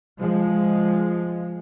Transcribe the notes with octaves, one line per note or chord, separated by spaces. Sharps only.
F3 G#3